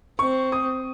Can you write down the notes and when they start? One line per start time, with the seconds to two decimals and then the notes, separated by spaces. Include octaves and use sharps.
0.19 C4 C#6
0.52 D#6